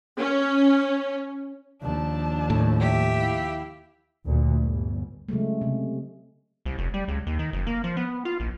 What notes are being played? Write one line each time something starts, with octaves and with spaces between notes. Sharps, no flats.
C#4
D#2 F3 D4 A5
A2
G4 E5
E4 F5
D2 A#2
G1
C#3 F#3 G#3 A3
C3
C2
F1
G3
C#2
D#2
D#3
F#1
A#3
F3
B3
F4
A#1